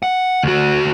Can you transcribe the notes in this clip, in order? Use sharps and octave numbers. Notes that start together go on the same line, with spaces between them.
F#5
D2 F#4